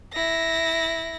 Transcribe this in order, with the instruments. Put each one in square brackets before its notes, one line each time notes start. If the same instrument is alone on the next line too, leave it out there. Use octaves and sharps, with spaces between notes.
[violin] E4 A#6